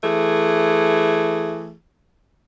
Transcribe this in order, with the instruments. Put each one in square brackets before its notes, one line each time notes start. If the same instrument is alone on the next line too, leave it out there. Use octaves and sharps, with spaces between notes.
[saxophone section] E3 A3 G#4